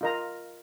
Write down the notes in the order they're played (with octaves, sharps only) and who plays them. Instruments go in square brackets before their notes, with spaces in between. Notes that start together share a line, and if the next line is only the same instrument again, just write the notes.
[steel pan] F4 A#4 D#5 A#5